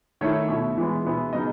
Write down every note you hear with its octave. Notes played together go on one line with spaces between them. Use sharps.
D#3 A3 E4 C#5
B2 A3 E4
E3 G#3 B3
B2 G#3 B3 E4
C#3 F#3 B3 D#4 D#5